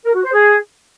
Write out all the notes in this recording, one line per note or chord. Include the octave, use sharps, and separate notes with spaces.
A#4
F#4
C5
G#4